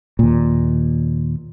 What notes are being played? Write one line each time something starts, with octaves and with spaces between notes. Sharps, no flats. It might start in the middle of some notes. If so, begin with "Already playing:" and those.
D#2 A#2